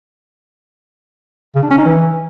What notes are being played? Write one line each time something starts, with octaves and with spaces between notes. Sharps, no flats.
C#3
D4
C#4
D#4
E3